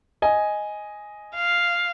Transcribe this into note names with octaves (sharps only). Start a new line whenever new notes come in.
D#5 G#5
F5